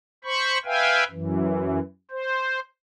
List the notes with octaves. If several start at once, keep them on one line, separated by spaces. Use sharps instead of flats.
C5 B5 C#6
B4 E5 F5 G5 G#5
F#2 E3
C5